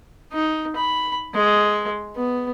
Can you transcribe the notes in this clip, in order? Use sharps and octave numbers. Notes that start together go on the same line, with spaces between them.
D#4
B5
G#3
B3